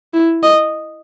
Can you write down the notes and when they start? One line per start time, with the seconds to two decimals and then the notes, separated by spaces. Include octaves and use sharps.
0.13 E4
0.43 D#5